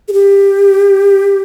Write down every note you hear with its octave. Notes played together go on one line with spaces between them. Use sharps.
G#4
G4